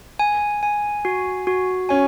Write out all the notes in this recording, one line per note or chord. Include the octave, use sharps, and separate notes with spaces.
G#5
G#5
F#4
F#4
C#4 G#5